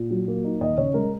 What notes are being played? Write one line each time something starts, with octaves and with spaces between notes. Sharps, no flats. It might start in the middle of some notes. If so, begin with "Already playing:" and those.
Already playing: A#2
F#3
A#3
D#4
D#2 D#5
C#3 C#5
G#3 A#4